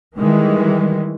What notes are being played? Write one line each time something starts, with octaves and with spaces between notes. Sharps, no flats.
D#3 E3 G3 G#3